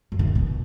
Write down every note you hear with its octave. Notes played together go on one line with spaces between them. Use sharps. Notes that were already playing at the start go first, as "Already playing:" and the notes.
F#2
D#3
C#3
B2